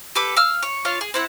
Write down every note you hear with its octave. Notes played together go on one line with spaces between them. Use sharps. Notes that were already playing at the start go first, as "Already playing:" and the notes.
G4 A4 B4 D6
F5 E6 F6
C#5
D4 F4 C#5 F5
G#4
C4 E4 F#5